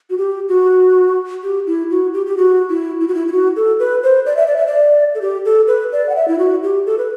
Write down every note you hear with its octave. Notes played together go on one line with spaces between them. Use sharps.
F#4
G4
F#4
G4
E4
F#4
G4
G4
F#4
E4
E4
F#4
E4
E4
F#4
A4
B4
C5
D5
E5
D5
E5
D5
A4
G4
A4
B4
D5
F#5
E5
E4
F#4
G4
A4
B4